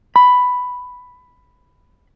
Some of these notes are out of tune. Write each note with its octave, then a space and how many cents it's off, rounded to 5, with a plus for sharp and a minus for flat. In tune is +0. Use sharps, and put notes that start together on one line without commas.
B5 +5